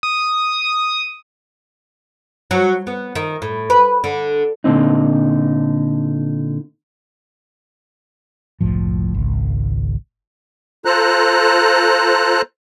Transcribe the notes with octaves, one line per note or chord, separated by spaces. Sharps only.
D#6
F#3
B3
D#3
A2
B4
D3
A#2 D3 C4 D#4
F#1 C2 A2 F3
G#1 C#2
F4 A4 C5 A#5 F#6